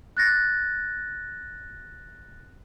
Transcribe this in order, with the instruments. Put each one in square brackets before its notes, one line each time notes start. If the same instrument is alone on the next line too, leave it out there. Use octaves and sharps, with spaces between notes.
[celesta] F#6 A6 A#6